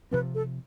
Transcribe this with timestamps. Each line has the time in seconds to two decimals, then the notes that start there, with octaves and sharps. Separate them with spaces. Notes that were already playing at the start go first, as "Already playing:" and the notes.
0.11 C3 F3 C4 B4
0.35 A4